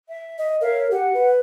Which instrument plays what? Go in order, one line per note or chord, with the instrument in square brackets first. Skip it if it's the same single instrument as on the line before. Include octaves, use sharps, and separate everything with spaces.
[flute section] E5
[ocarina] D#5
[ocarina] A#4 [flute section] C#5 E5 F5
[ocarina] G4 [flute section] F#5
[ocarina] B4